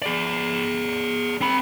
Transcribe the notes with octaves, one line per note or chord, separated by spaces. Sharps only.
G#4 D5
C4 B5